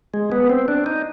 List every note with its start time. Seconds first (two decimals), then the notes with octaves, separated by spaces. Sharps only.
0.14 G#3
0.32 B3
0.50 C4
0.68 D4
0.86 D#4